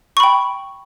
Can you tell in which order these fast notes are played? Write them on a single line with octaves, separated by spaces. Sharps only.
C#6 B5 G5